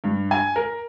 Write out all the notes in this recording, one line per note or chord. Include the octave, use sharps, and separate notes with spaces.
G2
G#5
A#4